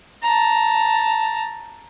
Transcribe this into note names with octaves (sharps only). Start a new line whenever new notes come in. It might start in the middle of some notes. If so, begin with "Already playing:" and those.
A5 A#5